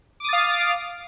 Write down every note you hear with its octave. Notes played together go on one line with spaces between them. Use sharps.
F5 D6 D#6 A6